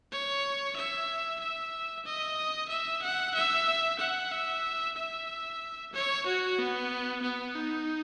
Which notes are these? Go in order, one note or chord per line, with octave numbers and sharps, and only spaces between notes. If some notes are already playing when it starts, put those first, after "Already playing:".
C#5
E5
E5
D#5
E5
F#5
E5
F#5
E5
E5
C#5
F#4
B3
B3
D#4